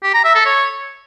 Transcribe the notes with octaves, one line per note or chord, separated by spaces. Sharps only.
G4
A#5
E5
A4
C#5